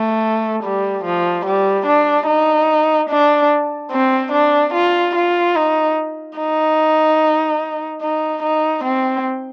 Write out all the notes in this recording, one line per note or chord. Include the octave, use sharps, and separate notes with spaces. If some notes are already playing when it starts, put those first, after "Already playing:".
Already playing: A3
G3
F3
G3
D4
D#4
D4
C4
D4
F4
F4
D#4
D#4
D#4
D#4
C4